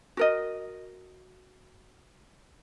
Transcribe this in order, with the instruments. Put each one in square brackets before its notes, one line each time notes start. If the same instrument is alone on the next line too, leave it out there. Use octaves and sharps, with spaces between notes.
[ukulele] F#4 A#4 D#5